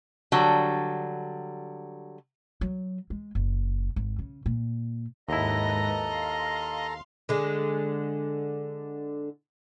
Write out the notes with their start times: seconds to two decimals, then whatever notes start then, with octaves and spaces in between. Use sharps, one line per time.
0.32 D3 F#3 G3
2.61 F#3
3.10 G#3
3.35 F#1
3.96 G#1
4.19 C#3
4.46 A#2
5.29 D#2 G#2 E4 A4 B4 D#5 A#5 A#6
6.07 F5 C6
7.29 D3 G#3